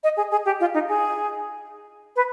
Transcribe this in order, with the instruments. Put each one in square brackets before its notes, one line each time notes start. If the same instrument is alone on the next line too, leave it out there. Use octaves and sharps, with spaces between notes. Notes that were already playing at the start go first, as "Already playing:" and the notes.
[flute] D#5
G#4
G#4
G4
F4
D#4
G#4
B4